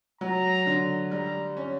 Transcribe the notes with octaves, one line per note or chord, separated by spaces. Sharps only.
F#3 A#5
D3
G3 A#5
C#4